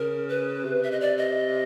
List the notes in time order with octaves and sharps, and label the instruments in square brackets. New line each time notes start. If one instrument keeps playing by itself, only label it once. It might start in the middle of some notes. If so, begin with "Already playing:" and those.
Already playing: [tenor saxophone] C#3 [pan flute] A#4
[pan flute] B4
[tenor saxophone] C3
[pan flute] E5
D#5
D5
D#5